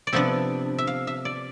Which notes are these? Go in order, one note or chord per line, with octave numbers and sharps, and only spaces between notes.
D5
C3 F3 B3 D4 E5
E5
F5
E5
D5